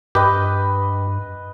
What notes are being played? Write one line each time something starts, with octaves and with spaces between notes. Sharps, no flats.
G2 G4 B4 D#5